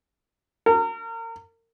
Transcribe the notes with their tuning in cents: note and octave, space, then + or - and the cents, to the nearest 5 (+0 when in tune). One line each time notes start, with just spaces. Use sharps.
A#4 -30